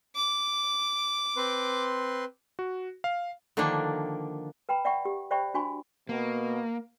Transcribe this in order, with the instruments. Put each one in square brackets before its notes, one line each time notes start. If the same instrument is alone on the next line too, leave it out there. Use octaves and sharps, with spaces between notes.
[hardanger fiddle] D6
[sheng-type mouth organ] C4 B4 C6
[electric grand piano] F#4
F5
[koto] D3 D#3 F3 A#3 D4
[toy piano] B4 G5 A#5 B5
D5 E5 F#5 G5 B5 C#6
G4
C5 D5 E5 G5 B5 C#6
D4 F#4 G#5 B5 C#6
[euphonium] B2 [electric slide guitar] A#3